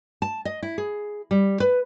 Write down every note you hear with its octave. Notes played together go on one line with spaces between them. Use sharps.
A5
D#5
E4
G#4
G3
B4